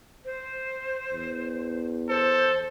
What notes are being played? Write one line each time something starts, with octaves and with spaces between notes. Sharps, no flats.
C5
E2
A4 C5